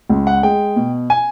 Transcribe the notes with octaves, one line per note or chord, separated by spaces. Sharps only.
C#2
F#5
G#3 G5
B2
G#5